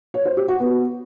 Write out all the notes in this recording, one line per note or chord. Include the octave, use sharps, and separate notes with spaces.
C#5
C5
G4
F#4
B3